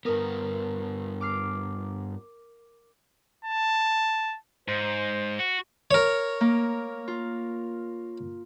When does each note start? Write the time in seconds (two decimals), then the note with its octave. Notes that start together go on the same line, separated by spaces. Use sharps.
0.05 G2 B3 A#4 D#6
1.21 D6 F6 C7
3.45 A5
4.68 G#2 C5
5.39 F#4
5.91 A#4 C#5
6.41 A#3
7.08 F4